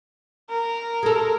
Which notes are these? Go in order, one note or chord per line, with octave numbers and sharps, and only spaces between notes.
A#4
G#3 A4